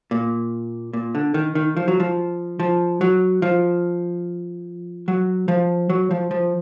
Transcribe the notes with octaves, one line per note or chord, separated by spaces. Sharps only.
A#2
A#2
D3
D#3
D#3
F3
F#3
F3
F3
F#3
F3
F#3
F3
F#3
F3
F3